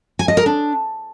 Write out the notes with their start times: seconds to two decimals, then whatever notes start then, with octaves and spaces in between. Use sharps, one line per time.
0.19 G#5
0.28 D#5
0.37 A#4
0.46 D4